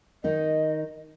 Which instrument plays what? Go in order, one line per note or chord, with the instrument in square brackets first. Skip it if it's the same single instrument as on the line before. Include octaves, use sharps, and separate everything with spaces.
[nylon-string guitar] D#3 D#4 [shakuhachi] D#5